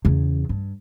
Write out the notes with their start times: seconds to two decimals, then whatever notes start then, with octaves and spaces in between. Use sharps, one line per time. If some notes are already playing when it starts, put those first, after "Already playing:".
0.05 E2 C#3
0.49 G2